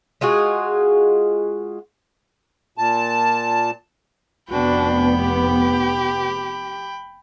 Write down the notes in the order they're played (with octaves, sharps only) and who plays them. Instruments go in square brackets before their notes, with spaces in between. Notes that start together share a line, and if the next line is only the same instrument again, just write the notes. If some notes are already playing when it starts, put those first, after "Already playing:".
[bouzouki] G#3 F4 F#4 G#4
[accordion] A#2 A5
[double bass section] F1 B3 [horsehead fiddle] D4 F#4 [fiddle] G5 B5
[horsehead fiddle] G4